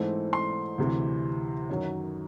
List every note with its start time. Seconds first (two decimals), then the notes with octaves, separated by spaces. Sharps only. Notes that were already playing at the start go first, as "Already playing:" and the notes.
Already playing: G#2 E3 A3 C4
0.33 C6
0.78 D2 C3 E3
1.70 F#2 D#3 F#3